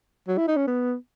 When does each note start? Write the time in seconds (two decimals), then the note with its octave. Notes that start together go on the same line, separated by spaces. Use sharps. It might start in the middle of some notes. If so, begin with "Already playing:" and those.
0.28 F#3
0.38 E4
0.48 D#4
0.57 C#4
0.67 B3